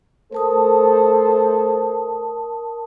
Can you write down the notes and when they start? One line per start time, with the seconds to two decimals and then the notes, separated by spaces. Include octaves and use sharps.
0.32 A3 A4 A#4 C5 A5 D#6